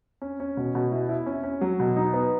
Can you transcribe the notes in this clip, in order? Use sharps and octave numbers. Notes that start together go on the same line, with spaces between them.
C#4
C#4
B2
B2
E4
E4
C#4
C#4
F#3
B2
D#4
B3